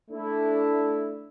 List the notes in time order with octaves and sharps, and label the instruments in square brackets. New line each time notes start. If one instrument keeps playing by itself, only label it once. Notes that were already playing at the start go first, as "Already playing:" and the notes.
[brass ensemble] A3 D4 E4